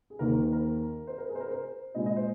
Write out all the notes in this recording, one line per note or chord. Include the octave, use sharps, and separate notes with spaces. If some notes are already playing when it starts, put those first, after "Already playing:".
G#4
D#2 D#3 A#3 A#4
C5
C5
A#4
C5
A#4
G#4
C5
A#4
C5
A#2 G#3 D#5
D#5
C5